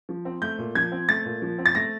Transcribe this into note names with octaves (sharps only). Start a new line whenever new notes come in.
F3
C4
A3 G6
A#2
F3 G#6
C4
A3 A6
A#2
F3
C4
A6
A3 A#6